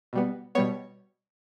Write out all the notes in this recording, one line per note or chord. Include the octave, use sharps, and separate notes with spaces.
B2 G3 B3
B2 G3 B3 C#5